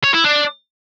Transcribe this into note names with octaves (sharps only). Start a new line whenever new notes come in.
C#5
E4
D4